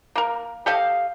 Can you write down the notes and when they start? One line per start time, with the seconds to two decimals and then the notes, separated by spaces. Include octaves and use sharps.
0.15 A#3 A#4
0.66 G4 A4 D#5 F5